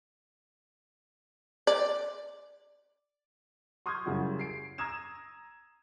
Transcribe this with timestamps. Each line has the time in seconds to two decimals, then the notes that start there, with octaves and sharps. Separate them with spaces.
1.67 D5
3.86 C6 C#6 D#6 F6 G6 G#6
4.06 F#2 C#3 G3 E4 F#4
4.39 C7 D7
4.78 A#5 D#6 E6 G#6 E7